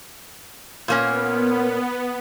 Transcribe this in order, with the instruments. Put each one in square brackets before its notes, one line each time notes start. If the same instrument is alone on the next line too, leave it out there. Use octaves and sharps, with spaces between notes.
[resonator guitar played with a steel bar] A#2 A#3 C#4 [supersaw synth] B3